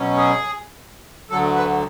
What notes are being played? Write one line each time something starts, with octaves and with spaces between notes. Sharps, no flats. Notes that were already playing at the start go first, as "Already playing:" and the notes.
Already playing: B2 F#3 C#4
G#4
D2 D3 F#3 A4
B4